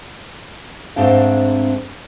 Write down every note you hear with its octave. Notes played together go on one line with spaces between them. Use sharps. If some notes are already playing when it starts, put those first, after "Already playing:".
G#2 A3 C4 D4 G#4 F5